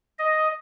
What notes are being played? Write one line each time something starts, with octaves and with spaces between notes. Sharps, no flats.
D#5